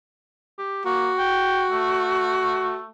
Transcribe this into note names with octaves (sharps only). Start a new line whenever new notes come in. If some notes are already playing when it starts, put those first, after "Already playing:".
G4
A#3 F#4
G5
A3